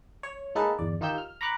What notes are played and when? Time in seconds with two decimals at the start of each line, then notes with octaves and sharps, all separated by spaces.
0.23 C#5
0.55 G#3 A#3 D#4 G#4 A4 B4
0.79 G1 E2 D5
1.01 D#3 D#4 F4 G4 E6 G6
1.18 F6
1.41 A#5 B5 C#6 D6 F#6